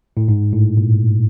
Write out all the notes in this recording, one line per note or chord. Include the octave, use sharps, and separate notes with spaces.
A2
G#2
A2
A#2